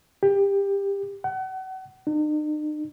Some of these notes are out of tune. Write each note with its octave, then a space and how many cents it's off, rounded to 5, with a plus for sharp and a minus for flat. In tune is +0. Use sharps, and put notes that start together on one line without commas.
G4 +20
F#5 +35
D#4 -45